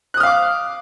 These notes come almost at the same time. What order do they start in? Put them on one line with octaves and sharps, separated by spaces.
F#6 D#6 F6 F5 D6